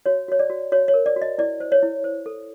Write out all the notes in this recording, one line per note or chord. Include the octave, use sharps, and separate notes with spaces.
F#4 C#5
F#4 C#5
D5
F#4
F#4 C#5
C#5
A#4
D5
F#4
D#5
E4 D5
C5
C#5
E4
C5
A4